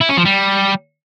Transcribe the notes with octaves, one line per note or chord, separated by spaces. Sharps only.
E4
C#4
F3
G3